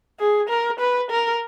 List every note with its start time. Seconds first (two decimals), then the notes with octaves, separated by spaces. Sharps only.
0.20 G#4
0.49 A#4
0.80 B4
1.11 A#4